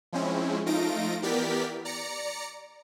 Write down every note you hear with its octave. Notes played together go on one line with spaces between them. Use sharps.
F3 G#3 C4 C#4 E4
F3 A3 D#4 F4 A#6 D7
E3 B3 G4 A#4 D5 B6
D5 A#5 C#7